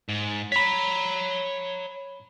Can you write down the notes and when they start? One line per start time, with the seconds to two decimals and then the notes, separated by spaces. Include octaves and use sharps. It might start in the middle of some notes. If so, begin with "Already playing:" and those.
0.09 G#2
0.52 C#5 A#5 B5 B6